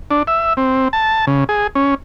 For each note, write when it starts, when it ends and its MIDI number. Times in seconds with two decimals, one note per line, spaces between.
0.11 0.23 62
0.27 0.53 76
0.57 0.88 60
0.93 1.25 81
1.27 1.44 49
1.49 1.67 68
1.75 1.95 61